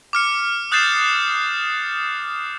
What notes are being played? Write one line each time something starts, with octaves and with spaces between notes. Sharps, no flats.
D6 F6 C#7
D#6 F#6 G6 A6 C7 E7